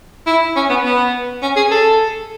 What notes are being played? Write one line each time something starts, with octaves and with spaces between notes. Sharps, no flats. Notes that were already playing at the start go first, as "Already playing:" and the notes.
E4
C#4
B3
B3
C#4
G#4
A4